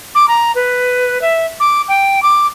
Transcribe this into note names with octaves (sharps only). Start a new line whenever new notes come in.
D6
A#5
B4
E5
D6
G5
D6